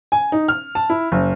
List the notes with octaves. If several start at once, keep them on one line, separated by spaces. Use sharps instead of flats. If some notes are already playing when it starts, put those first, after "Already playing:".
G#5
D#4
F6
A5
E4
F#1